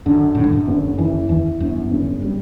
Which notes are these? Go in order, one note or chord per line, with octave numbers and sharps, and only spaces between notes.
F#2 D3
A2 D3
G2
F#2
F#1
F#2 E3
E2 E3
G1 F#2
F#1
G3